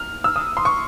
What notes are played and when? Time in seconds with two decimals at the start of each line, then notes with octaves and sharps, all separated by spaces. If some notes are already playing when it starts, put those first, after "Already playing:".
Already playing: F6
0.24 E6
0.36 D#6
0.57 C6
0.65 C#6